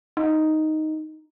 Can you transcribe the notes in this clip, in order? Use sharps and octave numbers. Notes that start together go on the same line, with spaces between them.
D#4